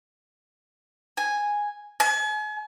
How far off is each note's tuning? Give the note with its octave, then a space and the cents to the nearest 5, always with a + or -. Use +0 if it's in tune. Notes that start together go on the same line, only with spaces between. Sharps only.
G#5 -5
G#5 +40